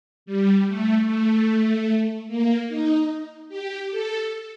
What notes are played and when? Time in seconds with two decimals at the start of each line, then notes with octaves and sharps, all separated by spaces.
0.26 G3
0.66 A3
1.06 A3
2.28 A#3
2.68 D#4
3.49 G4
3.90 A4